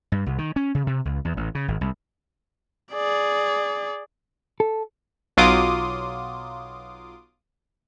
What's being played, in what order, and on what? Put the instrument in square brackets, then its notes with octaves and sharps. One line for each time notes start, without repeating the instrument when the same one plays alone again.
[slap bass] G2
C2
D#3
C#4
C#3
C3
C#2
E2
A1
C#3
G#1
C2
[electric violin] G#4 D5
[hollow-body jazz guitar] A4
[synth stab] B1 F#3 F4 C6 D6 D#6